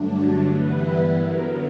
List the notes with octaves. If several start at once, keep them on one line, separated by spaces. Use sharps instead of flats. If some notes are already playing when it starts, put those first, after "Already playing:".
Already playing: G2 D3 F#3 A3 D4
G2 E3 G3 B3 E4 B4
F#2 D3 F#3 B3 A#4